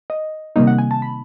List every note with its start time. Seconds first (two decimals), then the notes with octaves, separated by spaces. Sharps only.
0.10 D#5
0.56 C3 D#3 G3 A#3 D#4 D#5
0.67 F#5
0.78 G#5
0.91 A5
1.02 B5